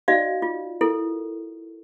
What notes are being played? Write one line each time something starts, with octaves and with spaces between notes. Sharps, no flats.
D#4 F#4 D5 D#5 F5
F4
E4 A4 A#4